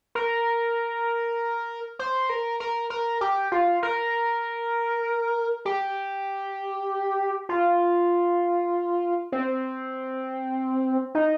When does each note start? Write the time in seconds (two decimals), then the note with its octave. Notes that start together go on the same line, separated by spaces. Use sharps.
0.15 A#4
1.99 C5
2.30 A#4
2.60 A#4
2.90 A#4
3.21 G4
3.52 F4
3.83 A#4
5.65 G4
7.49 F4
9.32 C4
11.15 D#4